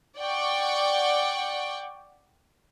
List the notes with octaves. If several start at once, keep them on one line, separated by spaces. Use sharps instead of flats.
D5 F#5 G5 C#6